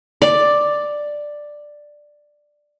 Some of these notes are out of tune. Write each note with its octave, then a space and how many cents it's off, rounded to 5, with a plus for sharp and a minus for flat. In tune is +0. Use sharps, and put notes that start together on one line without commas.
D5 +5